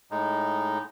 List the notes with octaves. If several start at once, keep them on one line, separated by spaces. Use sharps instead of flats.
A2 G#3 D#4